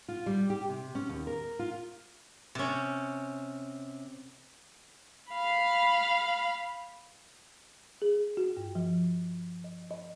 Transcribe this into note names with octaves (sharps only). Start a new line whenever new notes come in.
F4
G3
G4
C3
C#4
D#2
A#4
F4
C3 C#4
F5 B5
G#4
F#4
G2
F3
D#5
D#5